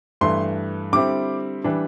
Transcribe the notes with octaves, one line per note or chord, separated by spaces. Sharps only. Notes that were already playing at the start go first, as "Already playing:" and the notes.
G2 E3 A3 C6
D3 G3 C4 E4 D6
E3 G3 D4